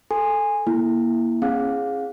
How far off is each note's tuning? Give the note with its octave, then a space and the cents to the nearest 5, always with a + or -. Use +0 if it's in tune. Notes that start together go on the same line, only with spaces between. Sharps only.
A4 +0 G#5 -15 C6 +0
A#3 +25 E4 +0
C#4 -40 G#4 -5 F5 +15